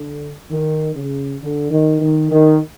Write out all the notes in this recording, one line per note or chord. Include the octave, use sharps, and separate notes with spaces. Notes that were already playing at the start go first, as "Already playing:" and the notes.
Already playing: D3
D#3
C#3
D3
D#3
D#3
D#3